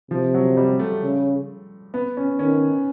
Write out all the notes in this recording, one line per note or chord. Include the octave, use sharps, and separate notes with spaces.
C3 F3
F#3
G3
A3
C#3
B3
C#4
D#3 C#4